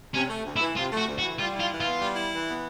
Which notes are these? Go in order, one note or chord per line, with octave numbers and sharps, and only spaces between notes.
C3 C#4
A3
D2
E4
E3
C3 F4
A3
F#4
D2
F#4
E3
G3 F4
E4
F4
E3
B3 F4
G3
E4
E3
B3